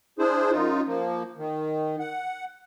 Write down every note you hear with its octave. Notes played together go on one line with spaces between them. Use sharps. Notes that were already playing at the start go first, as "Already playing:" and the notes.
D4 E4 G#4 C5
F#2 D#4 F4
F3 A#3
D#3
F#5